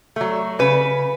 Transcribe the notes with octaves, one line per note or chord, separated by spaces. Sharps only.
F#3 A3
C#3 B4